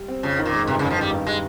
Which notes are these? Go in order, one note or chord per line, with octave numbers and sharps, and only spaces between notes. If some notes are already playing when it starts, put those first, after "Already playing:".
Already playing: G3
C4
F2 C#3
D#3
A#2
G#3
G1 C3
F2 C#3
F3
D#3 G3
G2
G3 G#3